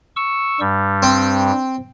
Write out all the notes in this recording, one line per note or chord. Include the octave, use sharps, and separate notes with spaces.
C#6 E6
G2 G3
C4